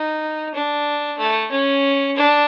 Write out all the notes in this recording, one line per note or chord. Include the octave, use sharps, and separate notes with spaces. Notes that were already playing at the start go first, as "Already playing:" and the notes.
Already playing: D#4
D4
A3
C#4
D4